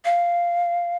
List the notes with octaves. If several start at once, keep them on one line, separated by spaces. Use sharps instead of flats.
F5